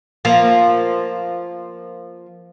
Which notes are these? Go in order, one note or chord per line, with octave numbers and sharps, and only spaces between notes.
F3 A#3